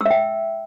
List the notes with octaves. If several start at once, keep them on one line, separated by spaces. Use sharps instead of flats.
E5 G5 E6